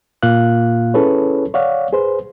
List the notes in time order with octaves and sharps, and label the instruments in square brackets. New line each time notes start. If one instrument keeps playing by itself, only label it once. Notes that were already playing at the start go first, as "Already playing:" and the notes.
[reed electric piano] A#2 A#3 F4 F5 F#6
C#4 E4 G#4 A4 B4 C#5
C#5 D5 F5 F#5
G#4 B4 C5